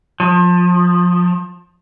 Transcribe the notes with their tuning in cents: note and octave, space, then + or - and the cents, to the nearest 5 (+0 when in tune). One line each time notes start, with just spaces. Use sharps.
F3 +25